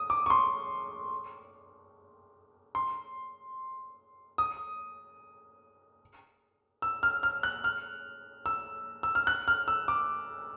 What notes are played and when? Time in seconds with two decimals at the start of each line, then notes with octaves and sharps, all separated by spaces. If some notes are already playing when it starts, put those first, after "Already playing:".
Already playing: D#6
0.10 D6
0.26 C#6
0.30 C6
2.75 C6
4.38 D#6
6.82 E6
7.03 F6
7.23 F6
7.43 F#6
7.64 F6
8.46 E6
9.03 E6
9.15 F6
9.27 F#6
9.48 F6
9.68 E6
9.88 D6